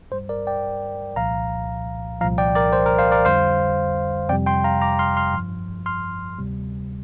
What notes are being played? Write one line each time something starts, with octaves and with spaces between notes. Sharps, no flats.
G2 G3 C5
A#4 D5
D5 G5
C2 A#2 F3 F5 A#5
C2 A#2 F3 F5 A#5
D5 G5
A#4 D5
C5
A#4
C5 F5
A#4 D5
F2 D3 G3 C5 F5
F2 C3 G3 D5 G5
G5 C6
F5 A#5
A#5 D6
C6 F6
C6 F6
G2 F3
C6 F6
D2 C3 G3